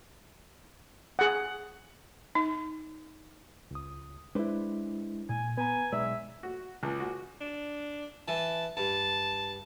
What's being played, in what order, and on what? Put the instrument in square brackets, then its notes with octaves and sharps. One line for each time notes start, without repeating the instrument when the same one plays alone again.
[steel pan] G#4 F#5
[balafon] D#4
[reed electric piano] C#2 D#6
[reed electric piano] G#3 E4 [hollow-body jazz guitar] D4 B4 C5
[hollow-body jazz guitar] A#2 [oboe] G#5
[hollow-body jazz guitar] B3 [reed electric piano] B4 A#5 [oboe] G#5
[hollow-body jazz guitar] B1 G#3 D5 [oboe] E5
[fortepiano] F#4
C#2
F#4
[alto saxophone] D4
[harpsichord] E3 [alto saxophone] A5
[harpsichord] G2 [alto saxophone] A5